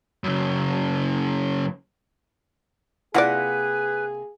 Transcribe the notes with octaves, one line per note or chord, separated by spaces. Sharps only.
F#2 C#3
C3 A#3 E4 F4 G#4 B4 D5 F#5